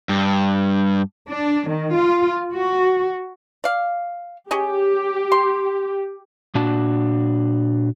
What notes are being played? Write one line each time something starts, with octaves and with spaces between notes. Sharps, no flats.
G2
D4
D#3
F4
F#4
D5 F5
C#4 G4 G#4 D#5
C6
A#2 D4 F#4 A5